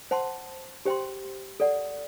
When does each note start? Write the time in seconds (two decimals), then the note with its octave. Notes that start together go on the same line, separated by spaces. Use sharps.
0.11 C5 F#5 A5 C6
0.85 G4 C5 G5 C6
1.60 A4 D5 F#5